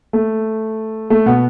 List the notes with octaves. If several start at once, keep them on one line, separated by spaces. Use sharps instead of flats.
A3
A3
B2 B3